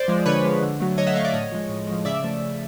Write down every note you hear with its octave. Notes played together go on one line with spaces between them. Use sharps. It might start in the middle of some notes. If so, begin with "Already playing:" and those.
Already playing: C5 D5
F3 G#3
D3 B4 C#5
F3 G#3
D3
F#3 A3
D3 C#5 D#5
E5 F#5
F#3 A3 D#5 F5
D5 E5
A2 C#5 D#5
F3 G#3
A2
F3 G#3
C#3 D5 E5
F3 A3
C#3